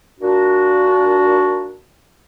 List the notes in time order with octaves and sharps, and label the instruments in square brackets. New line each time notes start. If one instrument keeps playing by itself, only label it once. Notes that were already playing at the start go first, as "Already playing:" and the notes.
[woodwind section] A#2 D4 F#4